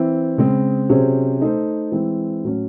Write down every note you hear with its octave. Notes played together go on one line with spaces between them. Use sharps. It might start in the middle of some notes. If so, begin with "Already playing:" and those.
Already playing: E3 C4 E4
C#3 G#3 C4
C3 F#3 C#4 G#4 C5
A3 D#4 A4 C5
E3 G#3 C4 E4
A2 F#3 C#4